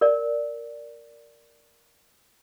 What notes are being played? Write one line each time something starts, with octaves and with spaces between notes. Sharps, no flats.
A#4 D5